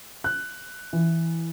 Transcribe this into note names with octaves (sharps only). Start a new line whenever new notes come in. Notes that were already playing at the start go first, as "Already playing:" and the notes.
F#6
E3